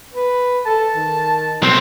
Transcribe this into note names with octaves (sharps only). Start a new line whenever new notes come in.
B4
A4 A5
D#3
B1 C4 C5